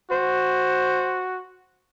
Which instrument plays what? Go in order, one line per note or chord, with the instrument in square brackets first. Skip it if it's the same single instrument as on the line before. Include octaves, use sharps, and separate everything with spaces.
[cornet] F#4 [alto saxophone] C5